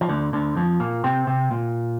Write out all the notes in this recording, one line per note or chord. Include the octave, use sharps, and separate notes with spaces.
F3
D2 D3
D2 D3
F2 F3
A#2 A#3
C3 C4
C3 C4
A#2